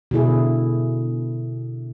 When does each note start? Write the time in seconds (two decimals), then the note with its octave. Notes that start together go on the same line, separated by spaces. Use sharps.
0.11 B2 D3 E4 G#4